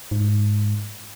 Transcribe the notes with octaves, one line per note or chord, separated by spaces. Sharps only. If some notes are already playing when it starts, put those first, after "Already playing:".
G#2